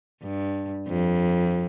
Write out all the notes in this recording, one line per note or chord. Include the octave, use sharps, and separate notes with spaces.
G2
F2